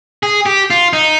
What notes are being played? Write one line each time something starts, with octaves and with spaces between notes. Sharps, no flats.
G#4
G4
F4
D#4